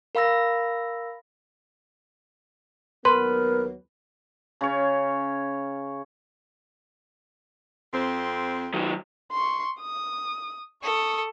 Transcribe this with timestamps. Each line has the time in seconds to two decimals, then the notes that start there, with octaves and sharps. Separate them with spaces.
0.15 A#4 F5 B5 E6 A#6
3.05 D#2 F#3 B3 A#4 B4 C6
4.61 C#3 C#4 C#5
7.92 F2 C4
8.74 D#3 F#3
9.33 C6 C#6
9.80 D#6
10.83 A4 C#6 D#6